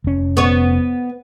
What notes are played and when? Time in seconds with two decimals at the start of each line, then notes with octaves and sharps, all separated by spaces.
0.04 F1 C#4
0.37 B3 C#5